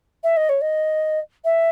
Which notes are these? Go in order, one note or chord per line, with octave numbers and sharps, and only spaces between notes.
E5
D#5
C#5
D#5
E5